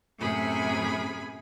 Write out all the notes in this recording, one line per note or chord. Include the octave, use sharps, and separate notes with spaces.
F#2 A2 C3 G#4 G#5 B5